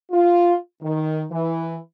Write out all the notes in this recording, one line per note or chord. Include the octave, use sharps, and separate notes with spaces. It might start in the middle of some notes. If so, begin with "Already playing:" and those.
F4
D#3
E3